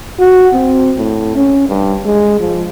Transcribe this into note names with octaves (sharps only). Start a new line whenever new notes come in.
F#4
C4
A2
C#4
G2
G#3
F3